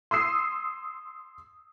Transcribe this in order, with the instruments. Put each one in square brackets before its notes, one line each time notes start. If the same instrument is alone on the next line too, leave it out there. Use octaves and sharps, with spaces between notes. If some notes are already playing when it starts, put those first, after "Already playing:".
[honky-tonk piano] C6 D#6 E6 C7